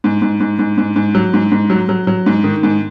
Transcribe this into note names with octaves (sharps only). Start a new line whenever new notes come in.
G#2
G#2
G#2
G#2
G#2
G#2
F#3
G#2
G#2
F#3
F#3
F#3
G#2
D#3
G#2